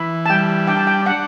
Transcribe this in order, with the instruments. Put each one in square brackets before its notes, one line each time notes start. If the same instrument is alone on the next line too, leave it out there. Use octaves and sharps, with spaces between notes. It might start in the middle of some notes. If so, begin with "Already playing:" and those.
Already playing: [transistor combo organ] E3 [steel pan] B5
[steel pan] A5
[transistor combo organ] G3 [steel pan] G5
[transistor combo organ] D4 [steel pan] G5
[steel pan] A5
G5
[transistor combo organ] D4 [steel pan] F#5